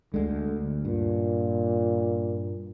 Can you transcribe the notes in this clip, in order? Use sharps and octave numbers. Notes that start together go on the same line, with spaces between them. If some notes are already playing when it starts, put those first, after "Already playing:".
D2 D3 G#3
G2 A#2